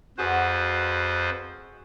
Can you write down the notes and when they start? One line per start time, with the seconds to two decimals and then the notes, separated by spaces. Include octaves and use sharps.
0.18 F2 F#4 G#4 B4 C5 D#5